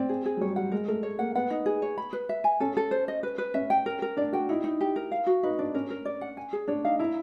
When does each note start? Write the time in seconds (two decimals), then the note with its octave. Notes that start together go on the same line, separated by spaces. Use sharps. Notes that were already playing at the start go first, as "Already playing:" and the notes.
Already playing: C4 D5
0.09 G#4
0.26 G#4
0.37 F#3
0.41 G3 C#5
0.56 G3 F#5
0.72 G#3 A#4
0.88 A3 A#4
1.03 C#5
1.19 A#3 F#5
1.35 B3 F#5
1.50 D#4
1.66 G#4
1.82 C#5
1.98 B5
2.13 B4
2.29 E5
2.44 G#5
2.60 C#4 A4
2.77 A4
2.91 C5
3.08 D#5
3.23 B4
3.38 B4
3.54 C#4 E5
3.70 G5
3.86 A#4
4.02 A#4
4.17 D4 D5
4.33 F#4 G5
4.49 D#4 E4
4.64 D#4
4.80 G4
4.96 A#4
5.12 F5
5.26 F#4
5.43 D#4 B4
5.59 D4 D5
5.74 C#4 A#4
5.90 A#4
6.05 D5
6.21 F#5
6.37 G#5
6.53 G#4
6.68 D4 C#5
6.85 D#4 F5
6.99 E4 A#5